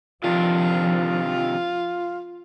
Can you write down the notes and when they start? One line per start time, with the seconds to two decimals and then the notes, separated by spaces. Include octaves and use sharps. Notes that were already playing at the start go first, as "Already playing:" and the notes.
0.24 C3 D#3 F3 D4 F4